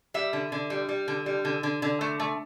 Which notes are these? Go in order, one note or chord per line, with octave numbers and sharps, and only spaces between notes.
G3 E5
D3
D3
G3
G3
D3
G3
D3
D3
D3
A3
A3